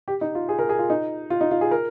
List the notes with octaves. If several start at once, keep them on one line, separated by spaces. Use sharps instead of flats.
G4
D#4
F4
G#4
A#4
G#4
F4
D#4
F4
D#4
F4
G#4
A#4